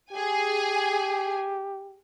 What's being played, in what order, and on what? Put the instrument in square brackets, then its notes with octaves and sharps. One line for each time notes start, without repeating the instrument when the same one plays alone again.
[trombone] G4 [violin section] G#4 G#5